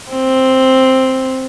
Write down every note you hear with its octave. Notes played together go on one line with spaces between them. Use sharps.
C4